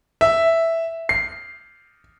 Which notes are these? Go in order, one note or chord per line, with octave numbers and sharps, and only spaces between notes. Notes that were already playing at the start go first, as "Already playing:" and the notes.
E5
C7